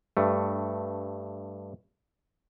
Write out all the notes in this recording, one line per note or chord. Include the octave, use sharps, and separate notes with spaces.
G2 A3